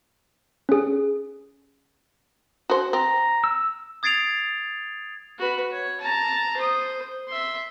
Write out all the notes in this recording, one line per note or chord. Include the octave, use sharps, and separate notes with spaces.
C#4 G#4
F#4 C5
C4 A#5
E6
D#6 G#6 A6 C7 D7 F7
F#4 B4
C#5
A5 A#5
C5 D#6
E5 C6